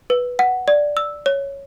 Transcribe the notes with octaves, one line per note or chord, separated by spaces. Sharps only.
B4
F#5
D5
E6
C#5